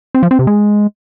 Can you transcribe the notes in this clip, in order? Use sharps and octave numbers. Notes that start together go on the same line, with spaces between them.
C4
F3
C4
C3
G#3